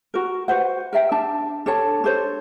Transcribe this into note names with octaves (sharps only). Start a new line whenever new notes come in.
F#4 A#4
F#4 B4 C5 F#5
A#4 D#5 E5 G5
D4 E5 A5
D4 A4 C#5 A5
D4 A4 C5 C#5